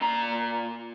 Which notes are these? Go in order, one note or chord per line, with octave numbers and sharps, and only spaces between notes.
A#2 A#5